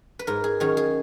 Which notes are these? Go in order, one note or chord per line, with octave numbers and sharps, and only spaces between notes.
B4
G#2 A#4
G#4
D#3 F#3 C#4 G#4
G#4